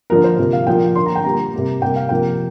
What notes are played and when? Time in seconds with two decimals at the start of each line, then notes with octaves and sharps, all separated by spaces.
0.10 D3 F3 A#3 A#4
0.24 C5
0.39 C3 F3 A#3
0.53 F5
0.67 A#2 F3 A#3 G5
0.96 D3 A#3 C6
1.06 A#5
1.16 G5
1.24 A#2 G3 A#3 A#5
1.53 C3 G3 A#3
1.82 C3 G3 A#3 G5
1.96 F5
2.09 C3 F3 A#3 G5